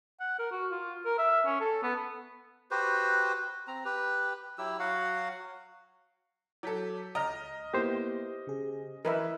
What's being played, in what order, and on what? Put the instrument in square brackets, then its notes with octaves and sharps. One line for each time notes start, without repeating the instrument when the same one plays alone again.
[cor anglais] F#5
A#4
F#4
F4
A#4
E5
C#4
A4
B3
[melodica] F#4 G4 B4 C5
C4 A#5
G4 B4
F#3 E4 G4 E6
F#3 F#4 F5 F#5
[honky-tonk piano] F#3 A4 [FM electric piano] D6 G6 B6
[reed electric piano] C#2 [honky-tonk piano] D#5 F6 [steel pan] A#5
[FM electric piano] A#3 B3 E4 [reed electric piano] G4 C5
[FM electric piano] C#3 G#4
[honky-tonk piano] E3 [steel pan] A#4 B4 E5 [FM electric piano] D#5